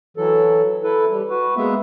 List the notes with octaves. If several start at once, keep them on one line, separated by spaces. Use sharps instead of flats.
E3 F#3 A4
E4 A4 B4
G3
F#4 B4
G#3 A#3 B3 E5